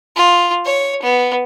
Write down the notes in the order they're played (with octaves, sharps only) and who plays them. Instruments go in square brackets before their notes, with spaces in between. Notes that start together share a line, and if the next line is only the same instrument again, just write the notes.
[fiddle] F4
C#5
B3